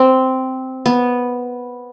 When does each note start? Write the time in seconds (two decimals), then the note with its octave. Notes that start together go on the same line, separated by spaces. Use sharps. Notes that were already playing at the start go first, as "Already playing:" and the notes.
Already playing: C4
0.86 B3